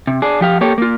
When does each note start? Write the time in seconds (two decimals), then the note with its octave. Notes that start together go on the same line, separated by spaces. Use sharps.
0.07 C3
0.22 D4 G#4
0.41 F3 G4 F5
0.61 A#3 G4 A4 C#5
0.78 A#3 F4